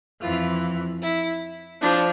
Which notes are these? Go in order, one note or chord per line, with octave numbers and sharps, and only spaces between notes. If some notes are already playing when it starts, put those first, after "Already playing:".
F2 E3 F4
E4
F3 D4